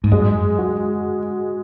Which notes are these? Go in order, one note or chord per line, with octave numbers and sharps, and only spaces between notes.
G#2
F#2 G#3
F#4